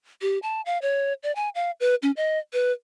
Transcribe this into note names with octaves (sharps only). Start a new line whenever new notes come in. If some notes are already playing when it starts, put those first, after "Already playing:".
G4
A5
F5
C#5
D5
G#5
F5
B4
C#4
D#5
B4